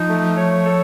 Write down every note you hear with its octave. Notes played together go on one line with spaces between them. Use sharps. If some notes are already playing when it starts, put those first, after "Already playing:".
Already playing: F3 D#4
A3
C#5
A4